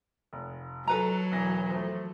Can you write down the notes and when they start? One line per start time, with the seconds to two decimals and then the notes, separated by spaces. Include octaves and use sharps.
0.33 F1
0.87 F#3 A4 B4 A#5
1.32 E1 E3 A#6
1.70 F3 A3